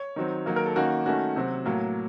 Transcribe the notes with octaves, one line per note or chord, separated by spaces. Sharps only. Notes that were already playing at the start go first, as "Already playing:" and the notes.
Already playing: C#5
D#3 F#3 C4
D#3 F#3 A#3
A#4
A4
D#3 A#3 C#4 F#4
D#3 A3 C#4 F#4
C3 F#3 C4
A2 F#3 A#3